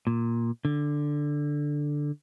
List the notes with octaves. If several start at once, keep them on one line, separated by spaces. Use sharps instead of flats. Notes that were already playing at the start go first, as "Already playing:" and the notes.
A#2
D3